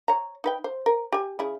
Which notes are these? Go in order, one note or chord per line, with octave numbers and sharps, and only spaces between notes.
C#5 A#5
D#4 B4 G5
C5
A#4
G4 G#5
C#3 E4 G#4